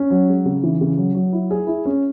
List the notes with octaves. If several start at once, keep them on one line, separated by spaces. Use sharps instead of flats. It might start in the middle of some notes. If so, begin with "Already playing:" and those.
Already playing: C#4
F#3
G#3
C#3
E3
C#3
F#3
F#3
E4
G#4
E4
C#4